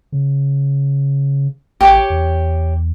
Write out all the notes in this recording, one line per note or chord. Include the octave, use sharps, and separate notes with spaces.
C#3
A1 G4 C#5 D6
E2